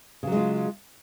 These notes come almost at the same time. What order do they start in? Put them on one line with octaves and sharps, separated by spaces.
C#3 F#3 G#3 F4